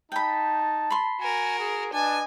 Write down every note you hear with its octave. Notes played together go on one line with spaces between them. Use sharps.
D#4 G5 A5 B5
B5 C6
F#4 A#4 G#5
G#4
D4 B4 D#5 G#5 A5